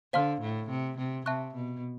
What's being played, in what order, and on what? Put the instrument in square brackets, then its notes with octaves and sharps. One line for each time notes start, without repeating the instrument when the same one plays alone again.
[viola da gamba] D3 [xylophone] C5 F5 A5 C6 F6
[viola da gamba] A2
C3
C3
[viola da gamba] C3 [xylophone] E5 A5 C#6 F#6
[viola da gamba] B2